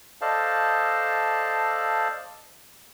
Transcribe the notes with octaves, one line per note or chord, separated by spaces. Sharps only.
A4 C5 D5 D#5 F5 A5